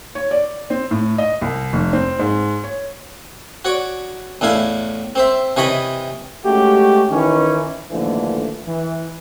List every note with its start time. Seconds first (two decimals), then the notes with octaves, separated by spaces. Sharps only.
0.15 C#5
0.31 D5
0.70 C4
0.91 A2
1.18 D#5
1.41 C2
1.73 F1
1.93 C4
2.19 G#2
2.64 C#5
3.65 F#4 C#5 D5
4.41 E2 A2 D4 E4 F5 G#5
5.15 C4 C5 E5
5.57 C3 E3 C#5 D#5 B5
6.45 G#3 A3 C#4 F#4 G4
7.11 D#3 E3 C#4
7.91 A#1 D#2 D3 E3 F3 A3
8.67 E3